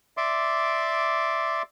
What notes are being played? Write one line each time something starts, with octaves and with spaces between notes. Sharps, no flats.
D5 E5 C6 D6